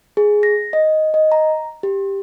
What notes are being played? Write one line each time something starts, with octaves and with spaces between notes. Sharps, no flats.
G#4
A#6
D#5
D#5
A#5
G4